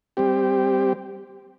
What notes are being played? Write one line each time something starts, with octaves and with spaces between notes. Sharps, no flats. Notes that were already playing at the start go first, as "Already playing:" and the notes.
G3 C4 G4